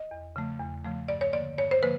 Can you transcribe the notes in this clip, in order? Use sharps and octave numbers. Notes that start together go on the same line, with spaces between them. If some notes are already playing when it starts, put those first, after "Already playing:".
Already playing: D#5
E2
C#3 F3 A3
E2
C#3 F3 A3
G2 D5
C#5
D3 F3 A#3 D5
G2 C#5
C5
D3 F3 A#3 B4